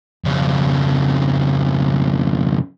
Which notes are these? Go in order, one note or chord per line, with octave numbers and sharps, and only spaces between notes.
F2 C#3